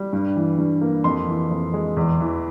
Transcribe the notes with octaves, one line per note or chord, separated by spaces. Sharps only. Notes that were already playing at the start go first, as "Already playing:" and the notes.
Already playing: G3
G2
E3
G2
A#3
F2 C6
E3
F2
G#3
E2
E3